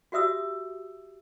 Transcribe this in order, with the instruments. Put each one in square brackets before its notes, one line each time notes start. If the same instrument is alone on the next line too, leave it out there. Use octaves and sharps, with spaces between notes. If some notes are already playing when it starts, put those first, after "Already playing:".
[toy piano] F#4 G4 E5 D#6 E6